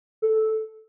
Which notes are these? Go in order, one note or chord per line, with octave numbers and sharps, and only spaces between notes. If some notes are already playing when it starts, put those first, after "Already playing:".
A4